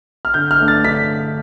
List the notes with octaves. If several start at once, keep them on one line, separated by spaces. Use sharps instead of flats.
F6
D3 G6
F6
A3 D4
A6
D3 B6